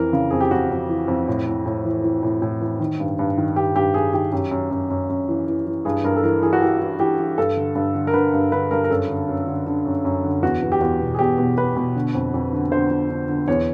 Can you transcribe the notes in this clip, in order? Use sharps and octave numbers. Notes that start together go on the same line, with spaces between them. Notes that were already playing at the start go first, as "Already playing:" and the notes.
Already playing: F2 E3 A#4
C#3
F2 G#4
G4
F2 F#4
F2
E3
F2
A2
A2
A2
E3
E3
A2
A2
E3
D#3
G2
G2
D#3
G2 G4
G2 G4
G2 G#4
D#3 G4
F#2 G4
F#2
F#2
F#2
F#2
E3
E3
E3
G2 G#4
G2 A#4
A4
E3 A#4
E3 G#4
F#4
E3 G4
E3
E3 G4
E3
G2 A4
D3
G2
D3
A#4
D3 B4
G2
D3 B4
G2 A#4
A#4
F#2 A4
D3
F#2
D3
D3
F#2
F#2
D3
E2 F#4
E2
G4
E2 F#4
B2
G#4
E2 G4
B2
B2 B4
B2
D3
F2
F2
D3
D3 C5
D3
D3
D3
E2 C#5